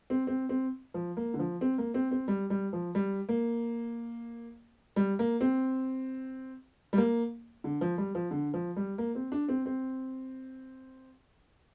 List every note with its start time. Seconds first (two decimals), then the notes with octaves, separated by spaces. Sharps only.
0.10 C4
0.27 C4
0.49 C4
0.94 F3
1.17 A#3
1.34 D3
1.39 F3
1.61 C4
1.78 A#3
1.94 C4
2.11 C4
2.28 G3
2.50 G3
2.73 F3
2.95 G3
3.29 A#3
4.96 G3
5.19 A#3
5.41 C4
6.93 G3
6.98 A#3
7.64 D3
7.81 F3
7.98 G3
8.15 F3
8.31 D3
8.54 F3
8.77 G3
8.98 A#3
9.15 C4
9.32 D4
9.49 C4
9.66 C4